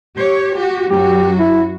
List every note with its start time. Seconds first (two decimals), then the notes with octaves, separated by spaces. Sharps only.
0.15 G4 C#5
0.57 F#4 G4
0.90 F#2 F#3 F#4 G4
1.39 E4